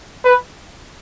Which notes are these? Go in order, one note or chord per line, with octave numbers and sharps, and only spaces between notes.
B4